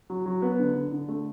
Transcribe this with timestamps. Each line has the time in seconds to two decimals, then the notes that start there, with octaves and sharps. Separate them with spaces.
0.10 F#3
0.26 F#3
0.42 B3
0.59 D3
0.75 D3
0.92 D3
1.09 A3